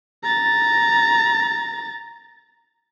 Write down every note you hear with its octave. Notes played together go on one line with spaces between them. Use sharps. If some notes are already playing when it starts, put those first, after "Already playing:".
A#5 A6